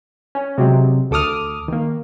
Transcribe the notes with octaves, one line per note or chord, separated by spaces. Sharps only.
C#4
C3 F#3 G#3 C4
D2 A4 D6 D#6 F6
D#3 A#3